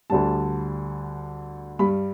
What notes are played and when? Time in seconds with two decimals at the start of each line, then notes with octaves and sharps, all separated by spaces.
0.10 D2 D3 G3 A5
1.79 G2 G3 B5